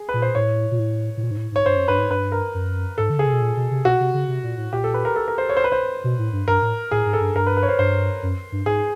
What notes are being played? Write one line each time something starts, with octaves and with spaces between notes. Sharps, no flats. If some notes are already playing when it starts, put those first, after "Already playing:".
Already playing: G#4
B4
A#2
C5
A2 C#5
A#2
A2
A2
A#2
G#2
A2
G#2 C#5
G2 C5
F#2
G2 B4
G#2
G2 B4
A#4
F#2
G#2 A4
D3
C#3 G#4
C3
B2
A#2
B2
C3
B2 F#4
C3
C#3
C3
A#2
A2
A#2 G4
A4
B4
A#4
A4
A#4
C5
C#5
C5
B4
C5
B2
A2
G2
G2 A#4
A2
A2 G#4
G#2
A4
G2
G2 A#4
B4
B4
C#5
C5
G2 C5
F#2
G2
G#2 G#4